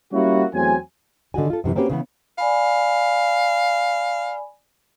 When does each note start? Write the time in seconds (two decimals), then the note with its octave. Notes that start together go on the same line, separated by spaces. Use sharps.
0.13 G3 A#3 C#4 E4 F#4
0.54 E2 F#3 A3 C4 G#5
1.34 D3 D#3 F#4 G#5
1.50 F4 A4
1.64 F#2 C3 E3
1.75 A#3 C4 C#4 F#4 G4 B4
1.90 C#3 E3 B3
2.38 D5 F5 G#5 B5